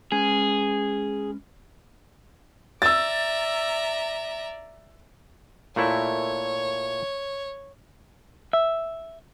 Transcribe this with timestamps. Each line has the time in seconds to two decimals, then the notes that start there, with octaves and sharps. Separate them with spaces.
0.12 G#3 C#4 G#4 B4
2.82 D5 E5 A#5 E6 A6
5.76 A#2 A3 E4 C#5
8.53 E5